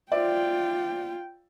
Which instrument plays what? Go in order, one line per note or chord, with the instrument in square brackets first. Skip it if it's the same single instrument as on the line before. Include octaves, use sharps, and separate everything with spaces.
[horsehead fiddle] F4 G5 [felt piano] C5 D5 E5